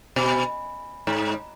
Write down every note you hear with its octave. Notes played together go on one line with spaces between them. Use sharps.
B2
G#2